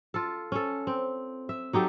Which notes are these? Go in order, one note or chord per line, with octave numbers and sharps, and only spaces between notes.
F4 A4
C#4 A4
C4
E5
F#3 D#4 G4 A4